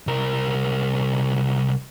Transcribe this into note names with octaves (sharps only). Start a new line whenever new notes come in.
C2 A#4